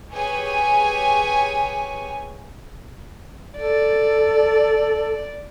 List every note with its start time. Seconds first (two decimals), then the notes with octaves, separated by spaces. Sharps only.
0.11 G4 G#4 B4 C#5 G#5
3.58 A4 D5